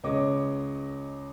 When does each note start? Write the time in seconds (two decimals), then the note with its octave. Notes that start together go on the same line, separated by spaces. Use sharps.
0.04 C#2 C#5 D#5 D6